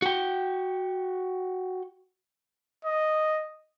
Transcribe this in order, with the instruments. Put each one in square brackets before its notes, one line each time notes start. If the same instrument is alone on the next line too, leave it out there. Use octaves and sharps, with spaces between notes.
[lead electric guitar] F#4 G5
[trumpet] D#5